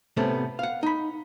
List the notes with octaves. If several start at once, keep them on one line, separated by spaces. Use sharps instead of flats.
A2 C3 A3 B3 C#4
F5 F#5
D#4 B5